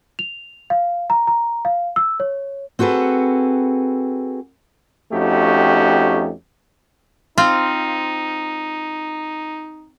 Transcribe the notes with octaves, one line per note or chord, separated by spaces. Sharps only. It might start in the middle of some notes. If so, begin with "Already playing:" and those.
F7
F5
A#5
A#5
F5
E6
C#5
C4 F#4 G#4 A4 B4
F2 A3 C#4 D#4 F#4 G4
C4 D#4 F4